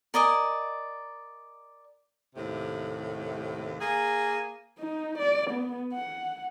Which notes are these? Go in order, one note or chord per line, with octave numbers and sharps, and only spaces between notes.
A#4 D5 D#5 G#5
D#2 A2 C3
A#3 G#4
D#4
D5
B3
F#5